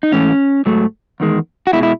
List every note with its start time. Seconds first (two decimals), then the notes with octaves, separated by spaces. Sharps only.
0.03 D#4
0.12 G#2 E3 A3 C#4
0.66 G#2 F#3 A3
1.20 E2 D#3 G#3
1.67 F#4
1.73 B2 G#3 E4
1.83 E4